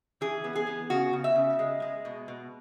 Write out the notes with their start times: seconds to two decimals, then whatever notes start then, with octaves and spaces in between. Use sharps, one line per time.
0.21 E3 G#4
0.44 B3
0.55 G#4
0.67 B3
0.90 C#3 F#4
1.13 C#3
1.24 E5
1.36 C#3
1.59 G#3
1.82 G#3
2.05 B2
2.28 B2